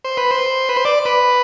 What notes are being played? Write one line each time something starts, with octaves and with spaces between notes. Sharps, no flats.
C5
B4
C5
B4
C5
D5
B4